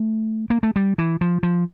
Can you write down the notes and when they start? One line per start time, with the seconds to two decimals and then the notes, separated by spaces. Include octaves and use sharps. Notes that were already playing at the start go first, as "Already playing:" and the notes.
Already playing: A3
0.50 A#3
0.63 A3
0.76 G3
0.98 E3
1.21 F3
1.43 F3